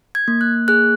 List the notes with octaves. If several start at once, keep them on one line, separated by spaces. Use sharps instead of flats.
G#6
A#3
F#6
G#4 F#6